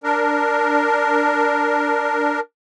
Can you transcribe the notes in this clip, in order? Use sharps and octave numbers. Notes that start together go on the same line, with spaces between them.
D4 A#4